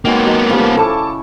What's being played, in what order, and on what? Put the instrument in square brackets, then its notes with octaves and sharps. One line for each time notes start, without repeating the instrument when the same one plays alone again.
[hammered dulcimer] D#3 F#3 G#3 [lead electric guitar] A#3 B3
[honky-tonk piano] F#3 D#5 [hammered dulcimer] D#4 A4
[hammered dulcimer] C#3 F3 F5 [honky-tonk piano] G3 A3
[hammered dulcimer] E4 C#6 [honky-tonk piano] A4 A5 D6